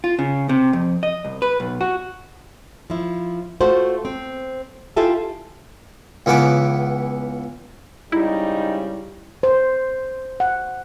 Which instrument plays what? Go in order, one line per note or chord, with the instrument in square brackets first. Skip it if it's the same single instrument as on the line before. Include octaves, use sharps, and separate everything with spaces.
[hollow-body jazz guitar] F4
C#3
C3
F2
D#5
C2
B4
B1
F#4
[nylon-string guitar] F3 E4
A3 F4 F#4 A4 C5
C4
E4 F4 G4 A4 E5 G#5
[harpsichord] C#2 E3 B3 D6
[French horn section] G#2 C#3 G3 [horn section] D#4 [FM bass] E4
[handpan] C5
F#5